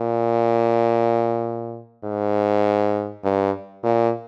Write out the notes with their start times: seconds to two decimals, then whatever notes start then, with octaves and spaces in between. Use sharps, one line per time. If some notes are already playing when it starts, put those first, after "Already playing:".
Already playing: A#2
2.04 G#2
3.24 G2
3.83 A#2